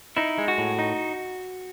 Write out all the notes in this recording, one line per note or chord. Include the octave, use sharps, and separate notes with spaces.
D#4 E4
G#3
F#4
A2
D#4